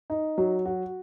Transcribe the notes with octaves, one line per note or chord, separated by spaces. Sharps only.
D#4
F#3
F#4